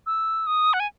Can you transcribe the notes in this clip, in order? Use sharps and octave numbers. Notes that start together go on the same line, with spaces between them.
E6
D#6
F#5
G#5